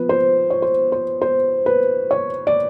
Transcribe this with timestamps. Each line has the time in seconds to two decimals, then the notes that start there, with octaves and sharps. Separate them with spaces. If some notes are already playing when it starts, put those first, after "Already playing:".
Already playing: F3 B3 B4
0.09 C5
0.50 C#5
0.62 C5
0.92 C5
1.22 C5
1.66 B4
2.11 C#5
2.47 D5